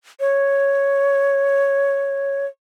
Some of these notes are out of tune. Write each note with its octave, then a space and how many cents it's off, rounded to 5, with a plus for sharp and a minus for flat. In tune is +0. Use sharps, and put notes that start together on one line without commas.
C#5 +0